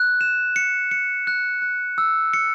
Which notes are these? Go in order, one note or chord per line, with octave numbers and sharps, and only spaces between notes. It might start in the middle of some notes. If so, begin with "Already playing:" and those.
Already playing: F#6
E7
C#7
C#7
F#6
F#6
E6
C#7